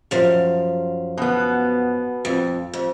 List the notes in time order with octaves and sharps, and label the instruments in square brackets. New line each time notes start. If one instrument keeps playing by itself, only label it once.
[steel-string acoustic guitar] F#2 F3 F5
[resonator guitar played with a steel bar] B2 B3
[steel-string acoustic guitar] F2
F2